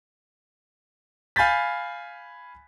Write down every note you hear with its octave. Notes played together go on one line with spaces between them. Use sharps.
F5 G#5 B5 G6 A6 B6